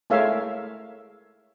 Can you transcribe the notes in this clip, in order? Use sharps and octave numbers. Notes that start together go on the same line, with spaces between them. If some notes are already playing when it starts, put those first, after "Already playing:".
G#3 A3 A#4 C#5 E5 F5